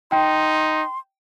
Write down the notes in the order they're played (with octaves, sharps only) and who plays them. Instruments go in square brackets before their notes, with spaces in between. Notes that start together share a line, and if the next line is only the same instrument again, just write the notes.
[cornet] D#4 [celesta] G5 [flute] C6